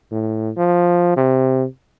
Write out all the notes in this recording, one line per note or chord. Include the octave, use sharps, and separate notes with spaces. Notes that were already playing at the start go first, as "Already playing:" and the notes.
A2
F3
C3